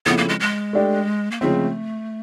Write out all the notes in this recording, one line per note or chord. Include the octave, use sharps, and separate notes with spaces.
C#3 F3 A3 B3 C4 E4
A#3
G#3
G#3
A3 D4 G4
A#3
C#3 F3 G#3 A3 C4